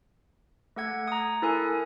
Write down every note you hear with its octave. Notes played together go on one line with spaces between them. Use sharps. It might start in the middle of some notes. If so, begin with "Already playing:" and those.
A3 A4 F#5 G#6
A#5 D#6
E4 A4 A#4 G#5